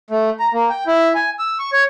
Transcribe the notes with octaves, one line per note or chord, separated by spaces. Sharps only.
A3
A#5
A#3
G5
E4
G#5
E6
C#6
C#5